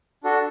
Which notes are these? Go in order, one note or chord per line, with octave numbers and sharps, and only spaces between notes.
D4 F#4 A4